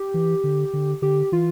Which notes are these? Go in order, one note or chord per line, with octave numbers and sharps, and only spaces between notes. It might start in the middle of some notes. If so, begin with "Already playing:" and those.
Already playing: G4
E3
D3
D3
D3 G4
E3 F4